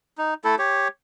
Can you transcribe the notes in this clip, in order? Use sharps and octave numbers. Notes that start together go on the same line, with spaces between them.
D#4
A3 E4 A4
G4 C#5